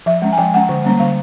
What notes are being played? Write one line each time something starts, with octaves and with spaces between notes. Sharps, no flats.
F3 E5
G#3 C#4
G#5
F3 G5
G#3 C#4 F#5
D3
G3 A#3 C#4
D3 F5